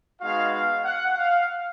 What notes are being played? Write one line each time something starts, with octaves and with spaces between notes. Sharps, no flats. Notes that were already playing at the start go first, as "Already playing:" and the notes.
G#3 B3 D#4 F#4 F5
F5
F#5
F5